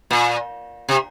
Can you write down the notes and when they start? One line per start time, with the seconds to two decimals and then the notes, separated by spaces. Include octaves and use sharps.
0.11 A#2
0.89 C3